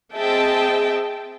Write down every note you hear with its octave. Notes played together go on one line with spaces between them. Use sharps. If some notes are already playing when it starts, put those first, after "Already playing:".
C4 G#4 D#5 E5 G5 A5